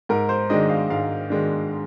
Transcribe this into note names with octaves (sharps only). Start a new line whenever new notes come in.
G#2 A#4
C5
D#3 G#3 D4 D#5
F5
G#2 F5
D#3 G#3 D4